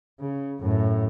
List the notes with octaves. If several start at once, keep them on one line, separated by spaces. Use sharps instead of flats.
C#3
F#2 A2